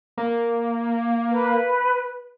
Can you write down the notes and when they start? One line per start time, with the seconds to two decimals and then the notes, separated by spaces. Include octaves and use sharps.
0.18 A#3
1.31 B4